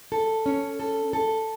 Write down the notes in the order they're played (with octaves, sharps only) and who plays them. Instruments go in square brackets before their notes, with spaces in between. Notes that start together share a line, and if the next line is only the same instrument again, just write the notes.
[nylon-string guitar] A4
C#4
A4
A4